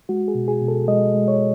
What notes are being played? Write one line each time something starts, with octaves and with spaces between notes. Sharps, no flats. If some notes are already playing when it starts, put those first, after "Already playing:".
G#3 F#4
G#4
B2
G#4
B2
A4
G#3 D#5
G#3
C#5